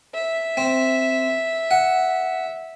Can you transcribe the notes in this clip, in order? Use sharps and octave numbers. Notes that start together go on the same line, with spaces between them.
E5
C4
F#5